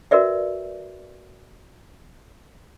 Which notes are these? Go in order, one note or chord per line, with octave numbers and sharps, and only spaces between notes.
F#4 A#4 B4 D5 E5